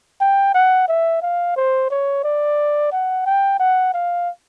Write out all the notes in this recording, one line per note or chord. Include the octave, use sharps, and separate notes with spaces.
G5
F#5
E5
F5
C5
C#5
D5
F#5
G5
F#5
F5